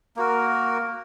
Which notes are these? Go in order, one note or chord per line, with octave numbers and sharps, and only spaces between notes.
A#3 F#4 A#4